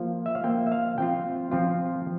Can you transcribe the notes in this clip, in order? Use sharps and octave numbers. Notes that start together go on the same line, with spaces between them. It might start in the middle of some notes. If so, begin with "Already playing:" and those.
Already playing: F3 A#3 F4
E5
F5
F3 A#3 F4 G5
E5
F5
F3 C4 F4 G5
F3 C4 F4